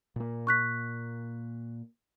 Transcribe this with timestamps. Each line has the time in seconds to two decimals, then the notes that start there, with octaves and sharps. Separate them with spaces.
0.16 A#2 A#3
0.47 C#6 F#6 B6